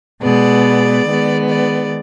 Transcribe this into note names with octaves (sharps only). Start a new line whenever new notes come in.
B2 G#3 B3 D5
D#3 G#3 B3
D5